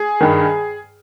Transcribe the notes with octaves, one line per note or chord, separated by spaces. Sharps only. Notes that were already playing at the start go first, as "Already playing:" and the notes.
Already playing: G#4
G2 D#3